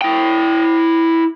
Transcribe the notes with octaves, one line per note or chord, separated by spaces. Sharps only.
E4 G5